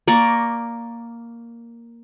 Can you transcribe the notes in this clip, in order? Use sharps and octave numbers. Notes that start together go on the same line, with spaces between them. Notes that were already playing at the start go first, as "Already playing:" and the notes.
A#3 D5 A#5 C#6